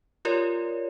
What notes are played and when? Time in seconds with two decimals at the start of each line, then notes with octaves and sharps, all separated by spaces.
0.25 F4 G4 A#4 C#5 D5